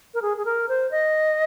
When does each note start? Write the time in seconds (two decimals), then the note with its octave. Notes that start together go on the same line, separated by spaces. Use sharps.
0.14 A#4
0.22 G#4
0.37 G#4
0.45 A#4
0.68 C5
0.91 D#5